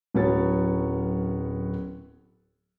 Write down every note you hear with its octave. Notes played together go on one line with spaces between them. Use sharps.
D1 F#3 B3 C#4 C#5 A6